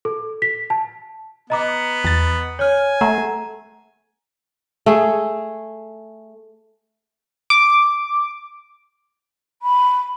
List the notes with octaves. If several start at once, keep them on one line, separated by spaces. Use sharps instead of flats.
A4
B6
A5
B3 D#5 A#5 D6
E2 A6
C#5 G#5 F6
A3 F#5 A#5
A3 G#4
D6
B5